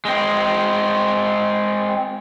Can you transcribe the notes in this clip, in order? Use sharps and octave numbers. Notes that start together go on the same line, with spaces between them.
G#3 C4